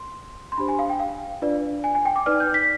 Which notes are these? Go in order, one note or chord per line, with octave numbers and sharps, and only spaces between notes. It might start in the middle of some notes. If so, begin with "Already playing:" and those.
Already playing: C6
C6
D4 G4 C5 B5
G#5
F5
G5
F5
D4 F4 B4 D5
G#5
G#5
G5
D6
D#4 B4 D5 F6
G6
B6